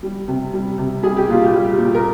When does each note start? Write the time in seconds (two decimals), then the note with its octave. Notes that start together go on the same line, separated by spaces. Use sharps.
0.03 G3
0.28 C3
0.53 G3
0.78 C3
1.03 G3 G#4
1.17 G4
1.28 A#2 F4
1.44 G4
1.54 G3
1.78 A#2
1.94 A#4